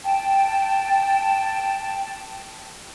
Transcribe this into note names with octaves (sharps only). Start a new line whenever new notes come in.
G5 A5